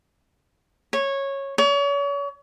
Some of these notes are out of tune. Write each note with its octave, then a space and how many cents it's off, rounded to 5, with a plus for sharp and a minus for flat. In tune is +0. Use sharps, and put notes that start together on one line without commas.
C#5 -15
C#5 +35